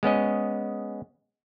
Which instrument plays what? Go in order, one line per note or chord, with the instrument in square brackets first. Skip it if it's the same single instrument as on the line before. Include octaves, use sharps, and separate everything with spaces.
[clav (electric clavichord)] G#3 B3 C#4 D#5